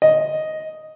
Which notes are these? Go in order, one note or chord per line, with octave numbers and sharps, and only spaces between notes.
D#5